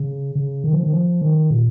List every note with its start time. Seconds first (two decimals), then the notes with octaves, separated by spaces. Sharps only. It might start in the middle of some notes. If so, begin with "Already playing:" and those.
Already playing: C#3
0.35 C#3
0.64 D#3
0.73 F3
0.83 D#3
0.93 F3
1.21 D#3
1.51 A#2